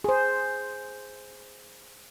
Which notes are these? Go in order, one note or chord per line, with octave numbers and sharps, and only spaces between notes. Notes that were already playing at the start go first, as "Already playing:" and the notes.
G#4 C5